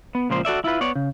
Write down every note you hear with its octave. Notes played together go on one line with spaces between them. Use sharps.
B3
C#2 A#2 F3 C5
F#4 A4 D5 E5
E4 F4 B4
B3 C#5 D5
C#3